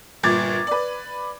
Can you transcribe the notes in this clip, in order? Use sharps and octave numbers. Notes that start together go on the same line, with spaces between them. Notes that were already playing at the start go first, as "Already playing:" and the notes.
G1 A#2 D6 G#6 A6
B4 D5